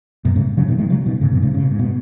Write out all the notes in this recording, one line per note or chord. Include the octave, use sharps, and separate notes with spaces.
F#2 B2
G#2 C#3
C#3 F#3
B2 D#3
D#3 G#3
C#3 F#3
B2 D#3
G#2 C#3
F#2 B2
G#2 C#3
C#3
B2
G#2
B2